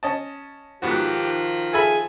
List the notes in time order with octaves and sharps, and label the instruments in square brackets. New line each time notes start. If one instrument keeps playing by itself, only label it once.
[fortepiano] C#4 D#5 A5
[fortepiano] G#2 B3 F#4 [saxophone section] D#3 F3 [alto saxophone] G4
[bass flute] G#4 [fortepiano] A4 E5 B5 [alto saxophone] G#5